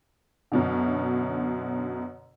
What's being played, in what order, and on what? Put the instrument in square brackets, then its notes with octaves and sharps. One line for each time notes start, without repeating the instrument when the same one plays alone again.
[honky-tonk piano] F#2 B2 D3